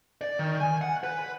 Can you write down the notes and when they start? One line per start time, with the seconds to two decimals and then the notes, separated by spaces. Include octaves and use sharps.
0.21 D5
0.39 D#3
0.60 G#5
0.81 F#5
1.04 B4